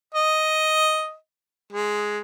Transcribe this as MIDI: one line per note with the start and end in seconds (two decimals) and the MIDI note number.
0.14 1.15 75
1.72 2.20 56